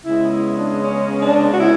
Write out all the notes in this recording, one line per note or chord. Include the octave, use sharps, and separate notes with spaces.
C#3 G#3 B3 E4
E4
D4
C#4
D4
F#4
E4